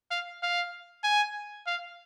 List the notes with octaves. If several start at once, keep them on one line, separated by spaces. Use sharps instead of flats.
F5
F5
G#5
F5